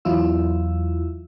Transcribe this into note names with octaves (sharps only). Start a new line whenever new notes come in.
E2 F#3 E4 F4 E6